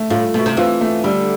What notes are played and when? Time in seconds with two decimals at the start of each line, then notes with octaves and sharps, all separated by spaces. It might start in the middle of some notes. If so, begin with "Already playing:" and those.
Already playing: A3
0.10 A2 F4
0.34 B2 A3
0.46 C3
0.57 E3 F4
0.81 A3
1.04 D3 G3